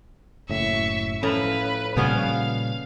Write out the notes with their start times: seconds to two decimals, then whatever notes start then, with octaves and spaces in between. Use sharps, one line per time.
0.49 F#1 A2 E5 C#6
1.23 A2 F3 C#4 B4 A#5
1.97 A#2 C#3 F3 G3 B3 C#4 F5